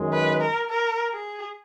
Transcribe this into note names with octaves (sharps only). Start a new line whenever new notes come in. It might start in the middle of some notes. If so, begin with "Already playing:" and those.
Already playing: F#2 D#3 G#3
B4
A#4
A#4
G#4